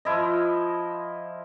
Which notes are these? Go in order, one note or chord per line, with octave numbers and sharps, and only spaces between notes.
F3 E4 D#5